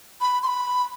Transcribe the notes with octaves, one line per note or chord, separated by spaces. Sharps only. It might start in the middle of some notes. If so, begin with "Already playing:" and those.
B5
C6
B5